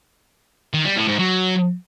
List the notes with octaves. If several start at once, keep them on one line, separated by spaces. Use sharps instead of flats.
D#3
G3
A2
G#2
F#3